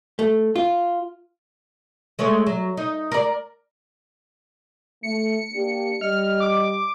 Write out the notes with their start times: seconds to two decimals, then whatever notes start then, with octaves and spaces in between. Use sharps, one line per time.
0.19 A3
0.56 F4
2.19 G#3 A3 C#5
2.46 F#3
2.77 D#4
3.12 A#4 D5
5.03 A3 C#7
5.52 A#3 D4 G4
6.01 G3 D#5 F6
6.40 D6